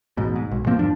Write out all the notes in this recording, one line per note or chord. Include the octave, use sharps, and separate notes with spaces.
A1 G#2 B2
G#2
B1
G#2 F3 A#3 C4
F2 G#2 F3 D4